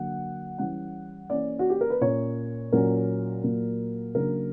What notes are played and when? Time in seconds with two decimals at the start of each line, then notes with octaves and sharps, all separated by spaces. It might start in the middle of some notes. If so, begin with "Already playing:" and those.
Already playing: D3 F#3 A#3 F#5
0.58 E3 G3 C#4 F#5
1.30 E3 A#3 C#4 D5
1.59 F#4
1.70 G4
1.81 A#4
1.90 B4
2.01 A#2 A#3 C#4 C#5
2.72 A#2 F#3 C#4 A#4
3.44 A#2 F#3 A#3
4.14 C#3 F#3 A#3 D4 A#4